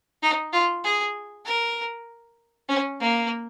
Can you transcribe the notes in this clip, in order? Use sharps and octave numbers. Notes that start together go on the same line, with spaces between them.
D#4
F4
G#4
A#4
C#4
A#3